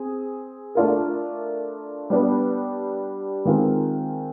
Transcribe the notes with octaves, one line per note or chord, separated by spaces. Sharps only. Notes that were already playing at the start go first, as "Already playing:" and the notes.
Already playing: C4 G#4
A3 D4 F4 A#4
G3 B3 D4 G4 B4
D#3 G#3 C4 F4 A#4